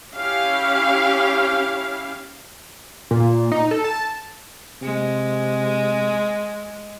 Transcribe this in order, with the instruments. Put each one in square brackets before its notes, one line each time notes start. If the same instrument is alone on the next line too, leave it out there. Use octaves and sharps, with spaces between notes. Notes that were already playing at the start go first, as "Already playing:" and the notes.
[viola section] C#4 E4 G4 F5
[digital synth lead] A#2
D#4
A4
A5
[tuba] C3 [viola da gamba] G#3